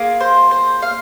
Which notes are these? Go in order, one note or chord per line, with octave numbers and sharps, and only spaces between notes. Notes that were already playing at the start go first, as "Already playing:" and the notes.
Already playing: A#3 F4 G#4
C5
C5
F5